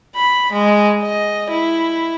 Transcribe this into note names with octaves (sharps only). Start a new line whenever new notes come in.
B5
G#3
D#5
E4